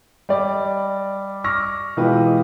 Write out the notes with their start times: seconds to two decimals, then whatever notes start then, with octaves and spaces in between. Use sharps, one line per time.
0.29 G3 D5 D#5
1.44 C#6 D6 E6 F6 A#6
1.97 B2 E3 G#3 F4 G4 B4